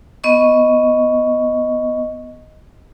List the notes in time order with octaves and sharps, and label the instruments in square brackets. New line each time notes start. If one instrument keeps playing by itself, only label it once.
[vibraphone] B3 D#5 C#6